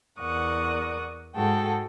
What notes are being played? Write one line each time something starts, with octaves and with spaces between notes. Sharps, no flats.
E2 A#4 D5 F#5 C#6 D#6
G#2 G#3 F#4 G#4 A4 G5